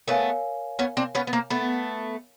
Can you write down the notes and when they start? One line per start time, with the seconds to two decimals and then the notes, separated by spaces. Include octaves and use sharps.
0.08 A3 B3 A#4 C#5 F5 G#5
0.79 B3 C#4
0.97 C4 D4
1.15 B3 C#4
1.27 B3
1.33 A#3 C4
1.50 A3 B3